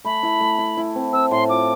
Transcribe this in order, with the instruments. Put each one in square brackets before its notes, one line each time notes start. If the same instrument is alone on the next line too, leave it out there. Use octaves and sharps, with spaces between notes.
[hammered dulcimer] A3 [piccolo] B5
[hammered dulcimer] E4
A3
E4
E4
C4
[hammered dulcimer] C4 [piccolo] E6
[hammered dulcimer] A2 [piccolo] C6
[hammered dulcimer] F4 [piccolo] D6